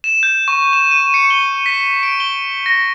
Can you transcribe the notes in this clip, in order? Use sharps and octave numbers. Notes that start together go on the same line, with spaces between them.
E7
G6
C#6
E7
D#7
C#7
G7
B6
D7
G7
A#6